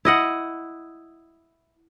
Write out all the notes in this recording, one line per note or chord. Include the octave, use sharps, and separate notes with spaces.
E4 D#5 F#5